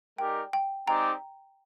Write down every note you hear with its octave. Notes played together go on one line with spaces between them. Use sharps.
G#3 D#4 G4 A#4 D5 G5
G5
G#3 C4 D#4 G4 D5 G5 A#5